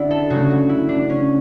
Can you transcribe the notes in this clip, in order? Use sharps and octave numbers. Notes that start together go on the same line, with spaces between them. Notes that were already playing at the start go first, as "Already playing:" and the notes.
Already playing: D3 D4 E4 F#4
A4
C#3 F#3 A3 F#4
F#4
E4
D4
C#4